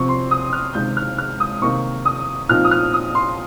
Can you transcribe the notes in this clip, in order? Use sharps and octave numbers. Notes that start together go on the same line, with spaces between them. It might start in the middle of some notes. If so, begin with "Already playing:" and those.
Already playing: C3 F3 C4 C#6
C6
D#6
F6
C#2 C3 D#3 G6
F6
F6
D#6
C3 D#3 A#3 D#4 C#6
D#6
A#2 F3 C4 D#4 F6
D#6
F6
D#6
C6